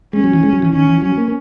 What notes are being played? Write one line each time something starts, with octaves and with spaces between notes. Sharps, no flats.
G#3 C#4
F#3
E3
G#3
F#3
E3
D#3 C#4
E3
F#3 C#4
A#3